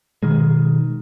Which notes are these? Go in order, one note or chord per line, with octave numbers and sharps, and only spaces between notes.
B2 D#3 G#3